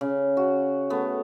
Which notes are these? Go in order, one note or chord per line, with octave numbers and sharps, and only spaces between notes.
C#3
F#4
A3 B3